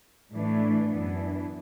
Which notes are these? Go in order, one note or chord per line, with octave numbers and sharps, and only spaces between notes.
A2 E3 A3 D4
F#2 E3 B3 D4